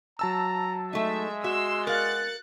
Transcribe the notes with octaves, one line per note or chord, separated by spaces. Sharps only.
F#3 A5 A#5 E6
G#3 A3 D#4 E5
F#4 E5 C6 E6
A#4 F5 F#6 A6 C#7